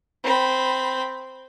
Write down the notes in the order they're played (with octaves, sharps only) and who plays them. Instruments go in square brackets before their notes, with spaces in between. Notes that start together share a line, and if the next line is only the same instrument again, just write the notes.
[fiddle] C4 B5